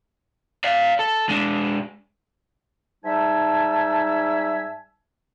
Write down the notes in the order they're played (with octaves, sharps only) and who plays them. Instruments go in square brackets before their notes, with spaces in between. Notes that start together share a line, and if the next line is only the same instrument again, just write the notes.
[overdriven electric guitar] D5 F5
A4
G#3 D4
[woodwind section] G#2 G3 D#4 E5 G#5 A5